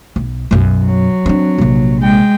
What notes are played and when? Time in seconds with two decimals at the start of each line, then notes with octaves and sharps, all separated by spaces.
0.16 B1
0.51 B1 F#2
0.84 F#3
1.26 C4 D4
1.58 A#1 C3
2.01 G#3 G5